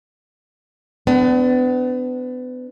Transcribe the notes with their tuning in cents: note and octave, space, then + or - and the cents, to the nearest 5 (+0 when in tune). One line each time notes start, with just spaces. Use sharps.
B3 +35 D4 +0